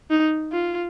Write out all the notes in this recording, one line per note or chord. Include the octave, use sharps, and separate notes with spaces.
D#4
F4